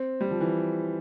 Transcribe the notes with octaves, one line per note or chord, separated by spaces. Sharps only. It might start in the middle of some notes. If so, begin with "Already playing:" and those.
Already playing: C4
G3
F3
E3